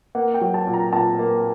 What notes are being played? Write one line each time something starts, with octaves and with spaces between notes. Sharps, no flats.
A#3 F#5
G5
F#3
A5
A#2
A#5
A#2 A5
A#3